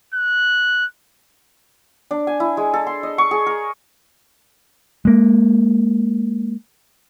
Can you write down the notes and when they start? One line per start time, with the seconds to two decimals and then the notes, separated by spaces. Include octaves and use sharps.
0.14 F#6
2.11 D4
2.27 G#5
2.40 E4
2.57 G#3
2.74 A4
2.87 C6
3.03 D#5
3.18 C#6
3.31 G#4
3.46 A#4
5.05 G#3 A#3